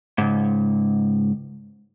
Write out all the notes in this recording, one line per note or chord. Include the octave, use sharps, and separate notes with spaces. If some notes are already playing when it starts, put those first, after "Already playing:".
C#2 G#2